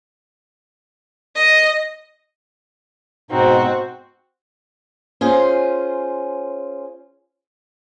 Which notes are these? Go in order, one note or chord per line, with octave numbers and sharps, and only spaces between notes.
D#5
G#2 B2 C4 D#4 F#4
C#4 F4 G#4 C5